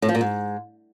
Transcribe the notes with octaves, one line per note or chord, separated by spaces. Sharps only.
A2
F3
A#2
G#2